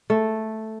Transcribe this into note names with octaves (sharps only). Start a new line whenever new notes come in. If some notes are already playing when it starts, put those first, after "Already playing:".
A3